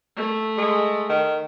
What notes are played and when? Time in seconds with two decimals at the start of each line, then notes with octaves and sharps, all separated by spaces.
0.16 A3
0.58 G#3
1.09 D#3